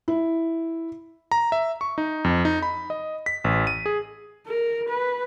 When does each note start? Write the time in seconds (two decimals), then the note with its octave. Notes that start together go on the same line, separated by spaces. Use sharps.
0.08 E4
1.31 A#5
1.52 E5
1.81 C#6
1.98 D#4
2.24 F2
2.45 D#4
2.62 B5
2.90 D#5
3.26 B6
3.44 A1
3.67 D#7
3.86 G#4
4.47 A#4
4.89 B4